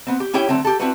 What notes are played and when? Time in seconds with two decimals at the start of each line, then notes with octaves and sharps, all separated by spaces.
0.07 B3 C4
0.20 G4
0.33 C#4 E4 G4 C#5 G5
0.49 D3 F#3 A3 C4
0.65 G4 A4
0.80 C4 D4 E4 F#4 B4